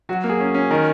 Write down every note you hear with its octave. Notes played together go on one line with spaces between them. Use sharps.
F#3 F#4
A#3
G#4
C#4
C#4
D#3 A#4